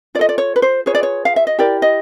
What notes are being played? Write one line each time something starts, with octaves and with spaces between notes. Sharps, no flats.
F4 A4 D5 D#5
D5
C#5
B4
C5
F4 G#4 B4 C#5
D5
C#5
F5
E5
D#5
E4 G4 A#4 D5
D#5